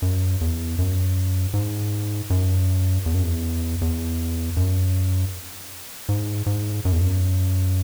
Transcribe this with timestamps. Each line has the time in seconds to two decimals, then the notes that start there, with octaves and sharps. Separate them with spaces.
0.02 F#2
0.41 E2
0.79 F#2
1.54 G#2
2.30 F#2
3.06 E2
3.14 F#2
3.23 E2
3.81 E2
4.57 F#2
6.09 G#2
6.46 G#2
6.85 F#2
6.92 E2
7.01 F#2